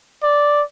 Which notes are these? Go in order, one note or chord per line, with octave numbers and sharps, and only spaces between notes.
D5